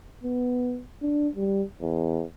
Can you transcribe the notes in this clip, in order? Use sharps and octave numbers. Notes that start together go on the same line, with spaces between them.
B3
D4
G3
E2